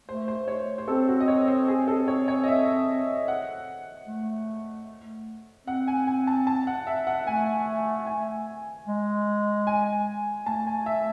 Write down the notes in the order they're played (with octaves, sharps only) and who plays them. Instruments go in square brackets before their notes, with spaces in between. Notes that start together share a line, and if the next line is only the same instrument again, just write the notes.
[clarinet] A3 [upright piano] C5
[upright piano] C5
C#5
C5
[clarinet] C4 [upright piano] A4
[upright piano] F#4
D#5
C#5
C5
G#4
A4
C#5
C#5
D#5
E5
F#5
[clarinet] A3
[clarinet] C4 [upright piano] F#5
[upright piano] G#5
G#5
A5
A5
F#5
E5
F#5
[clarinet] A3 [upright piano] G#5
[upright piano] G#5
[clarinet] G#3
[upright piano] G#5
[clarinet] A3 [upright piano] A5
[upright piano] G#5
E5